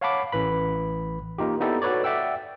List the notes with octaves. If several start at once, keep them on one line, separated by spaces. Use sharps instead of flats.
C#5 F5 F#5 A5 B5 D6
A1 E3 B4 B5
A#3 D#4 F4 G4
B3 D#4 E4 G4 A4 D5
F#4 A4 B4 C#5 D5
D5 E5 F#5 G5 E6